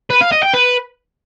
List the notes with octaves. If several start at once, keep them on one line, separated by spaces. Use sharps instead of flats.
B4
F5
D#5
G5
B4